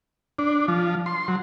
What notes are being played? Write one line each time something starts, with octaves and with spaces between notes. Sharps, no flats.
D4
F3
C6
F#3